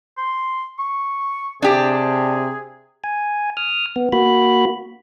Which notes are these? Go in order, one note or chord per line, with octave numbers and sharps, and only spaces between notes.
C6
C#6
C3 D4 G4 G#4
G#5
D#6 F6
B3
A#3 F#4 B5